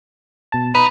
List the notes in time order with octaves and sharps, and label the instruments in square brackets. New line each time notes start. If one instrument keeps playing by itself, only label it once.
[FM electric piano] B2 A5
[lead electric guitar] D#4 [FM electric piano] B4 [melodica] B5